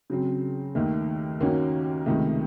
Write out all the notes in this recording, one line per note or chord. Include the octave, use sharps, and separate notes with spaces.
C#3 F#3 C4
D#2 D#3 A3
D#2 D#3 A#3 C#4 F#4
C#2 C3 D#3 A3